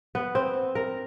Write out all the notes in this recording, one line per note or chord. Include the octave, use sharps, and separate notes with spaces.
B3
C4
A#4